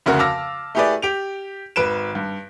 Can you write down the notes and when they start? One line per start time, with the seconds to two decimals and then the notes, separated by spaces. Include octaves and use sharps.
0.06 F1 D2 C#3 F#4 A#4
0.19 F5 A5 D6 E6 F6 A#6
0.75 A3 E4 G4 G#4 B4 D5
1.02 G4 D7 F7
1.76 G#1 B4 D7 E7
2.15 G2